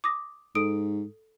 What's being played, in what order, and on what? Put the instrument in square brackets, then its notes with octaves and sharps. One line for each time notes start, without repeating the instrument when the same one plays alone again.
[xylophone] D6 D#6 A#6
[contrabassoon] G#2 [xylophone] A4 D#6 D7